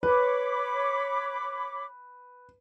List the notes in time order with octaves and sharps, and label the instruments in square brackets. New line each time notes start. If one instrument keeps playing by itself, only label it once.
[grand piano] B4 [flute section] C#5 B5 D6